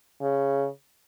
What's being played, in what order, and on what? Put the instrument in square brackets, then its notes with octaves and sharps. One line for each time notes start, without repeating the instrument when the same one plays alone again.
[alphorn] C#3